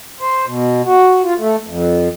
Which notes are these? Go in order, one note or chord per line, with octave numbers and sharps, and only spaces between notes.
C5
B2
F#4
F4
A3
F2